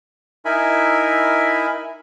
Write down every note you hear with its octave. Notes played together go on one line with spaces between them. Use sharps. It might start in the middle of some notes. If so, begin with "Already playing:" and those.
D#4 E4 A#4 E5 G#5 B5